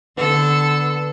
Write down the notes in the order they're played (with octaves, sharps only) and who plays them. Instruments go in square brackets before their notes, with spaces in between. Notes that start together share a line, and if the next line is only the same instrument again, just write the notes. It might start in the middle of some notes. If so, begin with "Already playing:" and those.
[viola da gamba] D3 A4 [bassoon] B3